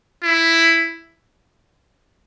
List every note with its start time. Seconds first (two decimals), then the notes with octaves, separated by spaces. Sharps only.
0.24 E4